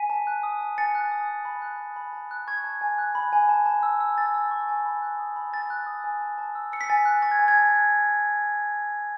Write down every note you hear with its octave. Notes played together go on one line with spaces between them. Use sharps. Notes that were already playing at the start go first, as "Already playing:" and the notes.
Already playing: G#5 B6 D#7
A5
F#6
D#6
A5
G#5 A6 C#7
F#6
D#6
G#5
B5
F#6
D#6
B5
A5
F#6
C#6 G#6
A5
G#5
F#6
B5
G#5
A5
A5
E6
E6
G#5 A6
E6
C#6
G#5
B5
F#6
D#6
B5
G#5 A6
F#6
D#6
G#5
A5
A5
E6
E6 C#7
B6
G#5 A6
F#6
C#6 A6
G#6
G#5
G#6
A5
F#6